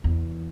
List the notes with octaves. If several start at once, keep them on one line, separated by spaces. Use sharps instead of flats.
E2